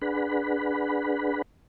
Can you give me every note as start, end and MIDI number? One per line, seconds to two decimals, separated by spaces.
0.02 1.42 62
0.02 1.42 68
0.02 1.42 71
0.02 1.42 78
0.02 1.42 83